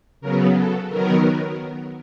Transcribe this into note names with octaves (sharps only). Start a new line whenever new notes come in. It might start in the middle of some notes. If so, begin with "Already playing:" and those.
C#3 F#3 B3 A#4
A4
D#3 F#3 B3 A#4